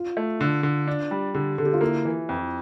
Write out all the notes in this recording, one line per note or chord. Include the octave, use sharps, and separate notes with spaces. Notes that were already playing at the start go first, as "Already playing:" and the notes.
Already playing: F4
A3
D3 F4
D3
D4
G3
D3 G4
D3 A4
G4
F4
A#3 E4
E3
F2